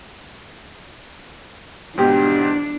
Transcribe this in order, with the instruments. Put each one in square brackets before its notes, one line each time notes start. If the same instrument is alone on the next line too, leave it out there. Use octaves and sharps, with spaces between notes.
[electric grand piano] G#2 B2 G4 [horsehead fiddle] D4